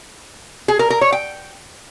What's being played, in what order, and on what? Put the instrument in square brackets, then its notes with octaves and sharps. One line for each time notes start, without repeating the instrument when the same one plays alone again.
[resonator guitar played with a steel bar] G#4
A#4
A#4
C#5
G5